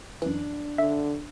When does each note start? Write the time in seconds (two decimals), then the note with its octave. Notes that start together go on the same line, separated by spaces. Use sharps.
0.22 F#2 E3 D4
0.78 D3 E5